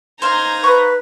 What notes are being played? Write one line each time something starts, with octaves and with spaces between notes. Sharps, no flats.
D#4 C5 F5 A#5 G#6
B4 C#6